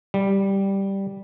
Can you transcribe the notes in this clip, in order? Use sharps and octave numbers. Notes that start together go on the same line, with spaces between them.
G3